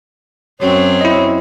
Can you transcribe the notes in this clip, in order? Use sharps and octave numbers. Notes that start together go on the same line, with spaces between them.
F#2 F#3 C4 C#5
E4 D#5